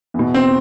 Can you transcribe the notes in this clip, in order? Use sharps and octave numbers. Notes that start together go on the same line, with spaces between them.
E2 B2
C4